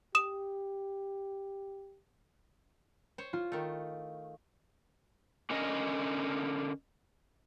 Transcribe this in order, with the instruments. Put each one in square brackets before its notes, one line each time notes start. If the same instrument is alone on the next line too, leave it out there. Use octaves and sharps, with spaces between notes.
[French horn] G4 [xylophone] D#6 E7
[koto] C5 C#5
[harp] F4
[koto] D#3 A3
[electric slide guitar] D3 C#4 A#4 D#5